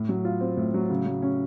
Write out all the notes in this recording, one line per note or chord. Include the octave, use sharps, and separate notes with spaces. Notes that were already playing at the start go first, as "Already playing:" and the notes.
Already playing: A2
F#3
F4
C4
A2
F#3
C#3
F#3
C#4